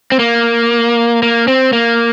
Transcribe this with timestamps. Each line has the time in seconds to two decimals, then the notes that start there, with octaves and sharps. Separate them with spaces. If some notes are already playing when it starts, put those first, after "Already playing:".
0.12 C4
0.19 A#3
1.23 A#3
1.48 C4
1.73 A#3